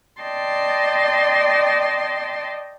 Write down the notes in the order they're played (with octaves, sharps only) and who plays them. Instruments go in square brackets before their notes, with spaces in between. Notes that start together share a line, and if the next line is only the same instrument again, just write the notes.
[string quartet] D5 D#5 G5 A5 C6